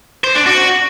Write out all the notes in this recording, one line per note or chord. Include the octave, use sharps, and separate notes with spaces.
C5
D4
F#4